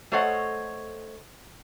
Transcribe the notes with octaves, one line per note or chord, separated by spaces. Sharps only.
A3 A4 C5 C#5 D#5 F#5